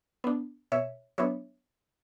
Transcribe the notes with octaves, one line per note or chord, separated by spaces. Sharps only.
B3 D4
B2 C#5 E5
F#3 B3 D4 C#5 E5